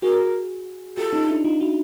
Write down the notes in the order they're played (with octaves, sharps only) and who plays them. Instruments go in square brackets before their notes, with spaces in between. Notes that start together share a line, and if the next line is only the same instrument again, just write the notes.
[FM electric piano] F#4 G#4 [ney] A#4
[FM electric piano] F4 G4 [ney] A4
[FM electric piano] C#4 D#4
D4 E4
D#4 F4
E4 F#4